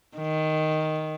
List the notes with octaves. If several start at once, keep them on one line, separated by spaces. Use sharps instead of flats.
D#3